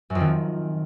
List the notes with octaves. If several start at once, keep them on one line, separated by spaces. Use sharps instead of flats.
F#2
F2
D#3